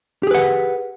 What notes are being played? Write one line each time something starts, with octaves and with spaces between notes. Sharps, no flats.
G4 G#4 B4 F#5